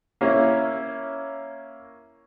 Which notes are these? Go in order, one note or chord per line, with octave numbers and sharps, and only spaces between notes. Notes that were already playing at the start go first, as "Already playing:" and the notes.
A#3 C#4 E4